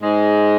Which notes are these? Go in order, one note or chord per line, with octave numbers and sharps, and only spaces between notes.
G#2 G#3